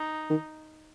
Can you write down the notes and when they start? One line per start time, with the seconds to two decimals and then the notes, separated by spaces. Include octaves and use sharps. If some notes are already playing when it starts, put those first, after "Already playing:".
Already playing: D#4
0.30 D#3